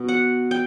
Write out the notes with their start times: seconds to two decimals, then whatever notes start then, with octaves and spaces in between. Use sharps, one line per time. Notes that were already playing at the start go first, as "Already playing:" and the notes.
Already playing: B2 B3
0.08 F#5
0.51 G5